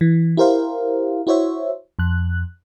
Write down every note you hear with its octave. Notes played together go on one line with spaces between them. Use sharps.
E3
E4 G4 A#4 C5 F5
E4 F#4 C5 C#5 E5
F2 F#6